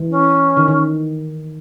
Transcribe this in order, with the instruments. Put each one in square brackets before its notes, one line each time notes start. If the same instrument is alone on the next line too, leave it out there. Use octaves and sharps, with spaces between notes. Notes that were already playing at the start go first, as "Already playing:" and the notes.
Already playing: [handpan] E3
[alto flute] C#4
[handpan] D#3
D#3